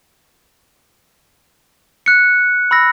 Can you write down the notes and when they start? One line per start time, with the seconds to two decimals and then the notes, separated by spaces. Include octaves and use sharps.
2.06 F#6 C#7
2.71 B5 E6 A#6